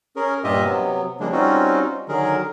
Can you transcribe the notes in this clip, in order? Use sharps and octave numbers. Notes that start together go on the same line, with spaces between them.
C#4 G#4 A#4
G2 A#2 F4 G4 D#5 E5
C3 F#3 B3
C#3 F3 G3 G#3 A#3 D4
G3 C4 C#4 D#4 F4 F#4
D3 D#3 F#3 G#4 A#4